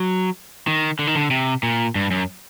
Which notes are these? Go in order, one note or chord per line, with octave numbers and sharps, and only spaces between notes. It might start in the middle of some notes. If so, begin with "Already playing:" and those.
Already playing: F#3
D#3
D3
D#3
D3
C3
A#2
G2
F#2